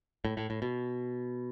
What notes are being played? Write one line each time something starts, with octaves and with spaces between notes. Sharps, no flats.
A2
A2
A2
B2